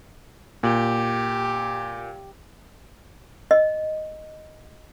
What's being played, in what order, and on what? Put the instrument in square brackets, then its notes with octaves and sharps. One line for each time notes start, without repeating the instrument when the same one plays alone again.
[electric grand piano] A#2 [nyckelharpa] G4
[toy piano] D#5